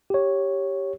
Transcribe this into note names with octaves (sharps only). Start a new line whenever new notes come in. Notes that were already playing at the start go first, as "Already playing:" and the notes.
G4 C#5